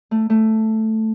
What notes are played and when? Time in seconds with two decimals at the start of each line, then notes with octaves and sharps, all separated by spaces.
0.11 A3
0.30 A3